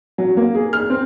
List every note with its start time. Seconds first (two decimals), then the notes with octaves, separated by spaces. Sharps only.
0.18 F#3
0.37 A#3
0.55 G#4
0.73 F6
0.90 C4